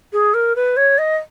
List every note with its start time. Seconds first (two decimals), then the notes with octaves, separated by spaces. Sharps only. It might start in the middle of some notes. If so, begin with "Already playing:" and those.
0.13 G#4
0.34 A#4
0.56 B4
0.77 C#5
0.98 D#5